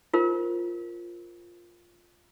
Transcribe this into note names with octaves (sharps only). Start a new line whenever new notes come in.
F4 A#4 C5